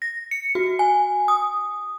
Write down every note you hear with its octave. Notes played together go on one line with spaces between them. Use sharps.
A#6
C#7
F#4
G#5
D#6